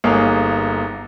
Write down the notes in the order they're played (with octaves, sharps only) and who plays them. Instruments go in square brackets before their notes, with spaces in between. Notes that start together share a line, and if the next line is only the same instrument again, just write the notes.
[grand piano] G1 A#3 D#4 G#4 C#5 F5